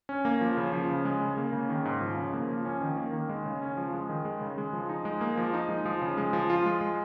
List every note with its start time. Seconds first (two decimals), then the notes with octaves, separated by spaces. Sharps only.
0.09 C#4
0.25 A#3
0.41 F3
0.57 C#3
0.73 F3
0.90 C#3
1.05 G#3
1.21 C#3
1.37 A#3
1.53 C#3
1.69 D#3
1.85 G#2
2.01 F3
2.17 C#3
2.33 A#3
2.49 F3
2.65 C#4
2.81 D#3
2.97 A#3
3.13 D#3
3.29 G#3
3.46 C#3
3.62 C#4
3.77 F3
3.93 G#3
4.09 D#3
4.25 G#3
4.41 C#3
4.58 G#3
4.73 F3
4.89 D#4
5.05 G#3
5.21 A#3
5.37 F3
5.54 D#4
5.69 G#3
5.86 F3
6.02 C#3
6.18 G#3
6.33 F3
6.50 F4
6.66 G#3
6.81 G#3